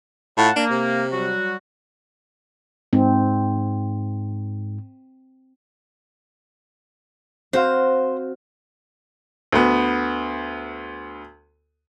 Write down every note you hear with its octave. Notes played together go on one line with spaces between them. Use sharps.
A2 F4 F#5 A5
A#3 D4
C3
F#3 G3 F#4
G#2 C4
C4 F#4 C5 F5
D2 B3